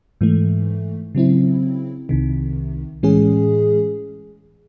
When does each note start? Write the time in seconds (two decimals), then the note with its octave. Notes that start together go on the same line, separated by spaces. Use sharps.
0.21 G#2 E3 A3
1.15 C#3 F#3 C4 E4
2.09 C2 C3 D#3
3.03 A2 E3 G#3 C#4 G#4